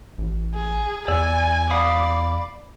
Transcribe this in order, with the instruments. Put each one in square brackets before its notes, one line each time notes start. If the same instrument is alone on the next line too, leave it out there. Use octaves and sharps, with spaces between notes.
[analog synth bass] A1
[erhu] G#4
[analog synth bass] E2 [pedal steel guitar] D5 E6 [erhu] G#5
[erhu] D5 [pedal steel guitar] F5 B5 D#6